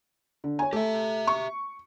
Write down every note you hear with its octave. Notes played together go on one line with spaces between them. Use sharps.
D3
C#5 G#5
A3 G4 E5
C#6